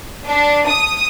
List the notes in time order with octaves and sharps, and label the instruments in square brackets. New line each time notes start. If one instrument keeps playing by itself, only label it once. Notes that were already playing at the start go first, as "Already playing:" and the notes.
[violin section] D4
D#6